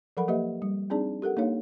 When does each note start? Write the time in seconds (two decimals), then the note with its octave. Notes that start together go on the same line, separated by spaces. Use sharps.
0.17 F3 F#3 A4 A#4 F#5 B5
0.28 A#3 G4 B4 D#5 E5
0.62 G3
0.90 C4 D4 D#4 G#4 D5 A5
1.22 G4 A4 A#4 F#5
1.37 A#3 D4 D#4 C#5 F5